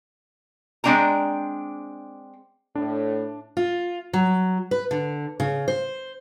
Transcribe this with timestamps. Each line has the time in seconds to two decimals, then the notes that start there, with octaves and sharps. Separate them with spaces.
0.84 G#3 C4 D4 G5 A#5
2.75 A2 D4
3.57 F4
4.13 F#3
4.71 B4
4.91 D3
5.40 C#3
5.68 C5